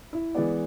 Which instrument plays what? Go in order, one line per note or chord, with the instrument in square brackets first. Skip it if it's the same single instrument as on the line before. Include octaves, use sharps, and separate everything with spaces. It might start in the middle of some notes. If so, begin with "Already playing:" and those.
[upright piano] E4
[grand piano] E3 G#3 B3 [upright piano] D5